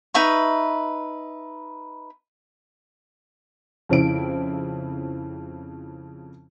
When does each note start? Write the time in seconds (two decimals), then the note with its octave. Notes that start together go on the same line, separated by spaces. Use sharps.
0.14 D#4 B4 E5 C#6
3.89 F2 C#3 C4 E4 D7